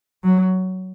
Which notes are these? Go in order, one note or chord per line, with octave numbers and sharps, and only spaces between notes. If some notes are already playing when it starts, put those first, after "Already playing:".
F#3